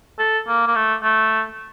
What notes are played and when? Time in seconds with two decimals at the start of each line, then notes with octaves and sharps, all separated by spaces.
0.19 A4
0.48 A#3
0.67 A#3
0.75 A3
1.03 A3